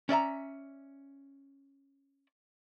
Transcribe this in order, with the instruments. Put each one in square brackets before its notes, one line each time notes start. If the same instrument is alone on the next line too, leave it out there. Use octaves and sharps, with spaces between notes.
[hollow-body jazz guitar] C#4 D5 E5 A#5